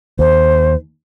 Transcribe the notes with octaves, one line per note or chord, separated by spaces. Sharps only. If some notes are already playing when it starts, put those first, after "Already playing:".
D#2 C5